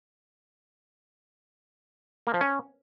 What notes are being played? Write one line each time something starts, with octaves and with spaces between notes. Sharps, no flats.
A#3
F3
C#4